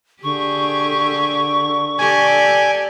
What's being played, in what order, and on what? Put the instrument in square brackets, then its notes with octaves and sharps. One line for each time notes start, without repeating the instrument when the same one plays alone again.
[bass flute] D3 [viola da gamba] G4 G#4 [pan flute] C#6
[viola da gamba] G4 A4 D5 [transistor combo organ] G#5